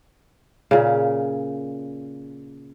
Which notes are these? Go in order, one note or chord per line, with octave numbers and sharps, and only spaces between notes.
A#2 C#3